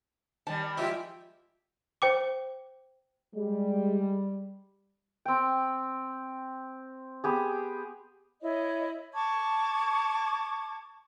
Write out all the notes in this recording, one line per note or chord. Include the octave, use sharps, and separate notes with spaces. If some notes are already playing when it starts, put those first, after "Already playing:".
D#3 G3 A5
G#2 F3 E4 F4 G4 E5
C5 G5 D6
G3 G#3
C4 G5
B3 G4 G#4
E4 C#5 D#5
A5 C#6 D6 G#6